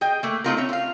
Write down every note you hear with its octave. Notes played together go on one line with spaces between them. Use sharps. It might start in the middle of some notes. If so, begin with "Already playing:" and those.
G#4 D#5 G5
A3 A#3
A3 C4 D#4 F4 G4 A#4
C#4 E5
F4 F5